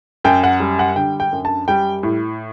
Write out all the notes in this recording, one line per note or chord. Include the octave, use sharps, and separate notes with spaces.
F#2 G5
F#5
G3
F#5
D3 G5
G5
F#2
A5
G3 G5
A2